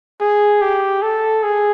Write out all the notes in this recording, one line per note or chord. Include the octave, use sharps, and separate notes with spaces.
G#4
G4
A4
G#4